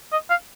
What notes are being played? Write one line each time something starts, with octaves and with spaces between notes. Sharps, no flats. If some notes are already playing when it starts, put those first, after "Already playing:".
D#5
F5